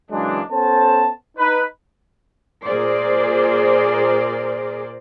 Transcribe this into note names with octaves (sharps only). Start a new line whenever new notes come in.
C#3 E3 F#3 G#3 A#3 D4
B3 C#4 A4 C5 A5
D#4 B4
A#2 G#4 A#4 C5 D5